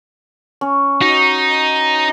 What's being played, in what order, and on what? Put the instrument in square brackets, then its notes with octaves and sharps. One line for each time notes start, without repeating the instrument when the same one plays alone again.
[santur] C#4
[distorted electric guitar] D#4 [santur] F#4